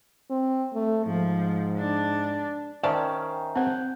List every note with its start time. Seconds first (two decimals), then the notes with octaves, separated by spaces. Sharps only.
0.30 C4
0.74 A3
1.06 G#2 F3
1.77 D4
2.83 D#3 C#4 C5 D5 E5 G5 A5
3.55 C4 C5 F#5 G6